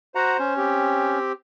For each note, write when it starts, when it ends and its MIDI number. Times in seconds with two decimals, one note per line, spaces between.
0.15 0.37 66
0.15 0.54 72
0.15 0.37 78
0.15 0.37 82
0.39 1.19 61
0.57 1.32 60
0.57 1.32 67